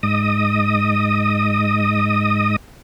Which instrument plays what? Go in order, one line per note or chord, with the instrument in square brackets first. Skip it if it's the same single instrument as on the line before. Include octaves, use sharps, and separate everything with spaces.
[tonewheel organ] G#2 D#5 D#6